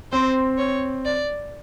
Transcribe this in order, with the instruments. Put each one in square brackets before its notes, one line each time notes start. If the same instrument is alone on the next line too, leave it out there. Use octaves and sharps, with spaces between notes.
[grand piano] C4 [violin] C5
[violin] C#5
D5